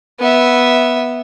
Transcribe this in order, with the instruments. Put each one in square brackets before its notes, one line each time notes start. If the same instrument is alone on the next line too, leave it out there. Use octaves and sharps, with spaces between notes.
[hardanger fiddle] B3 E5